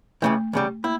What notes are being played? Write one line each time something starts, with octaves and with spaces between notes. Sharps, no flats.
C#2 C#3 E3 A3
E2 C#3 G3
A#3 E4